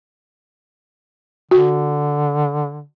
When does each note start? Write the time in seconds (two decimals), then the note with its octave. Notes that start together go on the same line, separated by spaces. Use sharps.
1.51 D3 F#4